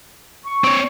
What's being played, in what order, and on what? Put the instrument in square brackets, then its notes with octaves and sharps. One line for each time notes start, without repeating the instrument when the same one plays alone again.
[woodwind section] C#6
[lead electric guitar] C4 C#5